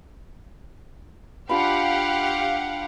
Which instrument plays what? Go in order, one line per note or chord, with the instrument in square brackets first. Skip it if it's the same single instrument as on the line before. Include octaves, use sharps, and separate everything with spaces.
[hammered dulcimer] D4 F4 B5 [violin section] G4 F5 F#5